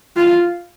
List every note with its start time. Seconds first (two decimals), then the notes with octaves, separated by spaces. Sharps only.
0.16 F4